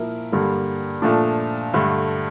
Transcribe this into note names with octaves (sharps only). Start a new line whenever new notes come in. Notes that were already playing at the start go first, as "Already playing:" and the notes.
Already playing: A#2 F3 A#3 E4 A#4
G2 D3 G3 A#3
A#2 F3 A3 D4
G2 D3 A3